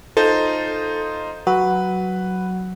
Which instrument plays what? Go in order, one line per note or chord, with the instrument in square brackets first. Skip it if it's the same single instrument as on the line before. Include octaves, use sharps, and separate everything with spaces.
[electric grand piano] D#4 F4 C5 [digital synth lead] A4
[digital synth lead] F#3 [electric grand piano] B4